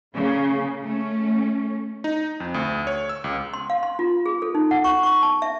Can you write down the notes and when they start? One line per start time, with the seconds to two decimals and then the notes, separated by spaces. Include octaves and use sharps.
0.14 C#3 A#3
0.82 A3 C#4
2.04 D#4
2.40 F2
2.54 D2
2.87 C#5
3.09 E6
3.24 C#2
3.54 C6
3.70 F5
3.83 C6
3.99 F4
4.26 G#4
4.42 A4
4.55 D#4
4.71 F#5
4.84 C#6
5.03 C#6
5.23 A5
5.42 E5